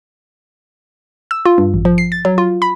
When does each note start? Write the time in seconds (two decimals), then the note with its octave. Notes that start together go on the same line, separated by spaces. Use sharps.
1.31 E6
1.45 F4
1.58 G2
1.74 A1
1.85 F3
1.98 C7
2.12 A6
2.25 F#3
2.38 F4
2.62 B5